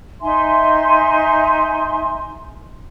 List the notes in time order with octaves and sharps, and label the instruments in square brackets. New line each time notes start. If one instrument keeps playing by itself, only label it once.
[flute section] D#4 E5 G#5 C6